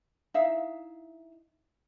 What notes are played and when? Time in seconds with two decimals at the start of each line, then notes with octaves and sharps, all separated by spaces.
0.34 D#4 E4 E5 F5